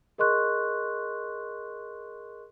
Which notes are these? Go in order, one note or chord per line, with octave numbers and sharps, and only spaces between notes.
G#4 A#4 D#5 C6 C#6 F#6